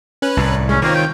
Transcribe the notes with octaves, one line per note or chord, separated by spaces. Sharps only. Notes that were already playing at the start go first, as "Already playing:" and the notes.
C#4 B4 F#6
C2 A2
G#3 C#4
D#3 A#3 C4 F4 C#5
G5